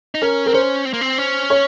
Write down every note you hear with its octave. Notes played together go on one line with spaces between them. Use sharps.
D#4
C#4 A#4
C4 A#4
C#4 C5
C4
A#3
C4
C#4
C#5